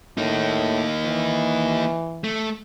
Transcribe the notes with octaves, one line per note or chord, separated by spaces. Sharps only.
A2 A#3 D#4
E3
A3